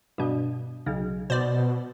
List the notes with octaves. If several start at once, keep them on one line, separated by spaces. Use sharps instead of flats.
G2 B2
B1 C#3
B2 C5 D5